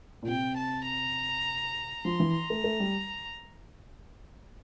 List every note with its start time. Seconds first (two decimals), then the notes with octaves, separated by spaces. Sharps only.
0.23 A#2
0.27 C3 G5
0.57 A5
0.87 A#5
2.05 F3 C6
2.20 E3
2.35 A#5
2.50 A3
2.64 A3
2.80 G3